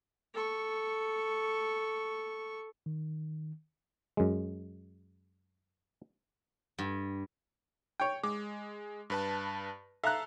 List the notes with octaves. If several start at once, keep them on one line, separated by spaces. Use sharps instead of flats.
A4 C#6
D#3
F#2 G#3
G2
C#5 G5
G#3 D6
G2 B4 A5
A4 E5 F5 A#5 F#6